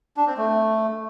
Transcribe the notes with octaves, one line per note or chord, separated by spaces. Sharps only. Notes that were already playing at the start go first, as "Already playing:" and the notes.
D4
C4
A3